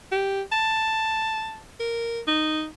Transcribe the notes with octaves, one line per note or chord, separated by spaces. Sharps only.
G4
A5
A#4
D#4